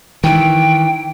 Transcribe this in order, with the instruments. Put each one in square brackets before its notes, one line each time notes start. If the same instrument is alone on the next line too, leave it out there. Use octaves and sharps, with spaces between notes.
[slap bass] D#3 E3 [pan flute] G5